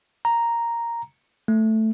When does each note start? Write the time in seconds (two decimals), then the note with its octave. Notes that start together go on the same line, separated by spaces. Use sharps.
0.25 A#5
1.48 A3